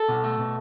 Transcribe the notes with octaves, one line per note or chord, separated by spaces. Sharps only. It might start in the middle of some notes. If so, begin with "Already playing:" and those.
Already playing: A4
B2
A3
B2